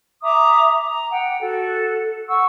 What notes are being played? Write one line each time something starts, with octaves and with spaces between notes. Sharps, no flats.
E5 A#5 D6 D#6
A#5
F#5 G5
F#4 A4
F#5 C#6 E6